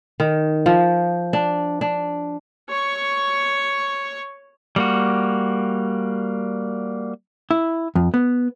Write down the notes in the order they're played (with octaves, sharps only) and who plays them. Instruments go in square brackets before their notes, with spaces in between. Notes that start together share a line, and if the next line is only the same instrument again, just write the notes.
[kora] D#3
F3
D4
D4
[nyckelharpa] C#5 C#6
[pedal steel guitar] G3 A#3 F#4
[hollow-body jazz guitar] E4
F2
B3